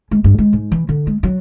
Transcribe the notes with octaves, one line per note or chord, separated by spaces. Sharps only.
G#3
G2
G#3
G#2
E3
D3
G#3
F#3